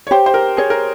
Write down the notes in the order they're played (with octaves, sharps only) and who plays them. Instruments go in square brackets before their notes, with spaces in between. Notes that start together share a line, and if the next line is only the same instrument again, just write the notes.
[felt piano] C#5
[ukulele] G4 [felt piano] C5
[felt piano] C5
A#4
[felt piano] G#4 [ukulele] C#5
[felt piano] A#4